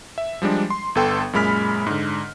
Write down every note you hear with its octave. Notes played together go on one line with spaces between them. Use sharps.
E5
F3 G3 G#3 D4
C6
G1 B3 A4 G5 C6
F#2 A#2 G#3 B5 F6 B6
G#2 D3